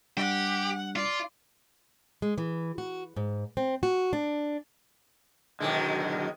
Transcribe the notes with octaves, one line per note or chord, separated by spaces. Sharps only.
G3 D4 G4 F#5
F4 D5
G#3
E3
F#4
G#2
C4
F#4
D4
B2 D3 D#3 F#3 G#3